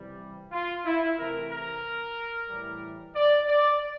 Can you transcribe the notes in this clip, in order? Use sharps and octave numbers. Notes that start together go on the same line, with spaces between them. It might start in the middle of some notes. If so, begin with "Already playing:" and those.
Already playing: C3 E3 G3
F4
E4
C3 E3 A3 A#4
A#4
A2 E3 G3
D5
D5